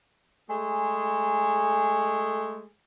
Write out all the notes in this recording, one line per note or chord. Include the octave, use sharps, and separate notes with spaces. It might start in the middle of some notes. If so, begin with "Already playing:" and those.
G#3 A3 G#4